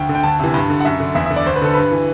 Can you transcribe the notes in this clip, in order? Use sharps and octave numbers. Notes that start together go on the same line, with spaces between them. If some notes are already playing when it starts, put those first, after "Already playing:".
Already playing: D2 G5
D3
G5
D2 A5
C3 E3
G2
D3
F#5
F#2 E5
D3
E2 E5
E5
D3
D5
D2 C5
B4
D3 A4
G2 B4
E3